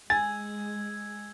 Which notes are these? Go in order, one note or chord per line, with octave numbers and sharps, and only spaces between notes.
G#3 G#5 E6 G#6 A6